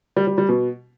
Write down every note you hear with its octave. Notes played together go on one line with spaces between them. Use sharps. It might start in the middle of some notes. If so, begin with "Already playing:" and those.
G3
G3
G3
B2